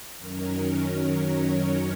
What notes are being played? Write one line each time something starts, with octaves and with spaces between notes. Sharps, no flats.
F#2 D#3 F#3 C#4 A#4
C#5